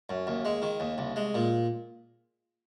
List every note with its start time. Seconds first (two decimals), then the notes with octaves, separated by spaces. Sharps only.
0.09 F#2
0.27 D#2
0.45 G#3
0.62 D#3
0.80 D#2
0.98 C2
1.16 G#3
1.34 A#2